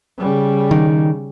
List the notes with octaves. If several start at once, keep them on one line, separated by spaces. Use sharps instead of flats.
C#3 G3
D#3